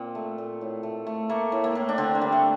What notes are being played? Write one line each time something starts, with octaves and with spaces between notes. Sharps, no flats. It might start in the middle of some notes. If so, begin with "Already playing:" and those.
Already playing: A#2 C4
A3
A#2
A2
A3
A3
A3 A#3
A2
A#3
A2
D4
D3 C4
A#3
G3
A3